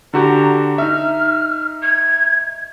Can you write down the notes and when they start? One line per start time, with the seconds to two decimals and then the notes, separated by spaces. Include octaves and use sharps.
0.14 D3 F#4 G4 A#5
0.78 D#4 E5 F6
1.82 G#6